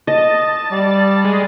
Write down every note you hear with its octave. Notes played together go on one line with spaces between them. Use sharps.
D#5 A5
G3 D5
G#3